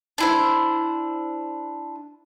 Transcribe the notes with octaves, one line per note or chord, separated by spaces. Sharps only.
D4 E4 C5